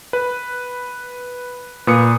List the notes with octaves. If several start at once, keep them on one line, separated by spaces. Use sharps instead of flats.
B4
A#2 B4 D#6 C#7